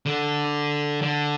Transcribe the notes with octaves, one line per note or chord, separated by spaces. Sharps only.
D3
D3